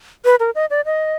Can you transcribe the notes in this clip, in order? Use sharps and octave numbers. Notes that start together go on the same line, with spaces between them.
B4
A#4
D#5
D5
D#5